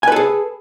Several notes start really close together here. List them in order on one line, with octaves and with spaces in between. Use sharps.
G#5 B4 A4 G#4